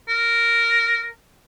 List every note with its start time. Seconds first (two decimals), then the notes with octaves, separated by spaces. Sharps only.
0.09 A#4